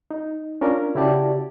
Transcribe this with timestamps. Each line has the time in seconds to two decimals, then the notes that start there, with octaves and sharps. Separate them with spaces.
0.11 D#4
0.61 C#4 D4 F4 A#4
0.95 C#3 E4 F#4 G4 D5 A5